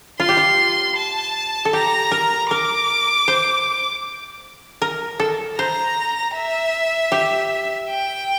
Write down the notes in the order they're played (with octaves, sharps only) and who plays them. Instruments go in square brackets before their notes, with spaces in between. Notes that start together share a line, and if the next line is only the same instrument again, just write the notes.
[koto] F4 [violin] C6
[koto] G4
F4
[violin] A5
[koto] A4
[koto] G4 [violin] A#5
[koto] A#4
[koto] A#4 [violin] D6
[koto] C5
A#4
A4
[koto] C5 [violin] A#5
[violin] E5
[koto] G4
[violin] G5